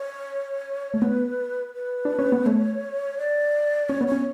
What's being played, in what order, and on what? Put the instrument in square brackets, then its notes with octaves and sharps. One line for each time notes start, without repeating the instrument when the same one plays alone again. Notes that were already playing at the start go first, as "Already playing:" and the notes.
Already playing: [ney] C#5
[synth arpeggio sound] A3
[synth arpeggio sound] B3 [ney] B4
[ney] B4
[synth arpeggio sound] D4
C#4
B3
[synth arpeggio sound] A3 [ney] C#5
[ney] D5
[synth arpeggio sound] C#4 [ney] C#5
[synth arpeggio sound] B3
[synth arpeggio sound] C#4 [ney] C#5